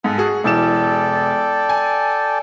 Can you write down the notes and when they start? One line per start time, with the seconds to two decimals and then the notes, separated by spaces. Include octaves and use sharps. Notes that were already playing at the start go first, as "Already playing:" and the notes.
0.04 G#2 A4 F#5 G#5
0.18 F#4 G#4
0.44 E1 E3 A4 D5 G5 E7
1.69 G#5